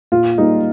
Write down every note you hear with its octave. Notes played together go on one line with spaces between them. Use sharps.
A#2 F4
G3 A#3 D#4